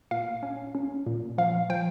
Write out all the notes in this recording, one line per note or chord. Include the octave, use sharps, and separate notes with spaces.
A#2 F5
C#4
C#4
A#2
F3 F5
F3 G5